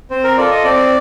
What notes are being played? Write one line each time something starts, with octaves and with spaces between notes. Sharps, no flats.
C4 C5
A#4
F4 A4 D5
D#5
C4 D5